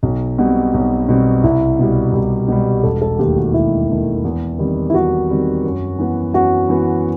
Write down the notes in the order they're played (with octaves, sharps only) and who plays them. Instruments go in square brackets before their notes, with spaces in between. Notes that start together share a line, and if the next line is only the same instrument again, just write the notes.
[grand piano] B1
B2 G3 C4
B1
B2 G3 C4
[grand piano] C2 [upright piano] E4
[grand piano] B2 G3
[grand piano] C2 [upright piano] G4
[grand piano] B2 G3
[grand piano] E1 [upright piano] A4
[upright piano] A4
[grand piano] D#2 D#3 A3 [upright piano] G4
[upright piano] F#4
[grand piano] E1 [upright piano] E4
[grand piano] D#2 D#3 A3
E2
D#3 G3 C4
[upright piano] E4
[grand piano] E2 [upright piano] F#4
[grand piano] D#3 G3 C4
F#2
E3 B3
[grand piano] F#2 [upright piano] F#4
[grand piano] E3 B3